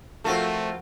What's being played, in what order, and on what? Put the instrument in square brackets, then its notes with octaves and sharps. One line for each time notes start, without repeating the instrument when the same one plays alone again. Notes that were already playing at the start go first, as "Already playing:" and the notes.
[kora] F3 F#4 A#4 [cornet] A3 [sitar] C4 F4 A4